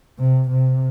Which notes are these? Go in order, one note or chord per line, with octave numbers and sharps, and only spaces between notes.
C3
C3